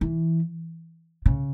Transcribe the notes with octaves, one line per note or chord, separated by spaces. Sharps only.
E3
C#3